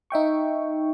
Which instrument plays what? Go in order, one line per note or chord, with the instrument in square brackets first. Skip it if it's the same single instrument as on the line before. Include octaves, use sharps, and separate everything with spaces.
[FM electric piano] D#4 E5 G5 C#6